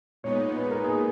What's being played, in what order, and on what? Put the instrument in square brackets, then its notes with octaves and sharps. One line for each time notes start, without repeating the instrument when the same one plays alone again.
[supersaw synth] A#2 G#3 B3 D#4 [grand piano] C#5
[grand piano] B4
A#4
G#4